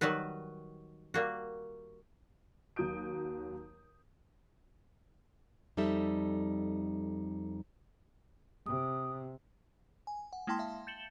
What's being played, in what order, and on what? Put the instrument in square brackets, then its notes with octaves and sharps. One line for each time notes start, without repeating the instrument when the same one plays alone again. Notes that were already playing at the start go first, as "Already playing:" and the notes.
[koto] D#3 F#3 G3 F#4 B4
G3 A#3 F#4
[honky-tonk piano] D#2 F#3 D#6 G6 D7
[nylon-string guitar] F2 G3 D#4 A4 E5
[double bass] C3 [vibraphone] D#6
[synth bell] G#5
F#5
G#3 A#3 E4 G5 A5 C6
E5 F5 A5
G6 A6 C#7 E7 F#7 G7